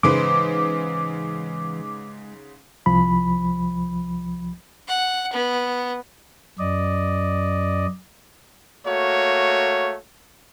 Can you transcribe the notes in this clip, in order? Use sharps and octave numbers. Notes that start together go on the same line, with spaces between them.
G#2 C#3 E3 G#3 B4 C5 D6
C2 F3 B5
F#5
B3
F#2 D5 D#5
A3 A#3 F#4 C#5